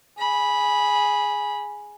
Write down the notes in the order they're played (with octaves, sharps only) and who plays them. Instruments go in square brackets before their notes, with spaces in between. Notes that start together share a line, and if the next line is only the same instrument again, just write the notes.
[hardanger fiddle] G#4 B5